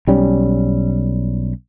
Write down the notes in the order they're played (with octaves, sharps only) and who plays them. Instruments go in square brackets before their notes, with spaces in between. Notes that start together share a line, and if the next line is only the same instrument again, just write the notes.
[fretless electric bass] B1 G3 C#4